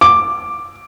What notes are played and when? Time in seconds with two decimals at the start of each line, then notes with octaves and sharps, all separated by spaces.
0.01 D6